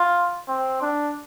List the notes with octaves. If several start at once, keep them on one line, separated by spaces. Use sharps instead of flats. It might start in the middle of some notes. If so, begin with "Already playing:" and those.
Already playing: F4
C4
D4